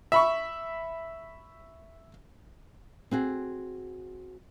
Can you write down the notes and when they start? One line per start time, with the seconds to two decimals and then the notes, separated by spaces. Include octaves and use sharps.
0.12 E5 B5 C#6
3.11 C4 F#4 G#4